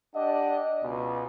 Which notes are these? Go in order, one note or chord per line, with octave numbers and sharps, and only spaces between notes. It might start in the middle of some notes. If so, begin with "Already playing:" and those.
D4 G4 D5 D#5 F#5
C#2 B2